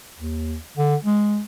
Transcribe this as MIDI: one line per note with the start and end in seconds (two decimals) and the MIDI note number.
0.18 0.56 39
0.77 0.96 50
1.05 1.42 56